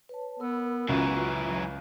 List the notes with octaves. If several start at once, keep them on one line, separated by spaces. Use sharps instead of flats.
B4 C#5 A5
B3 A#4 B5 E6
C#2 F#2 E3 F4 F#4 E5 A#5
F#3